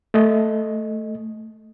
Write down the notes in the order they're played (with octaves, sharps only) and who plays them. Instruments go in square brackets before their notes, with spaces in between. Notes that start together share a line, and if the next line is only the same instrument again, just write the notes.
[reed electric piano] A3 D#5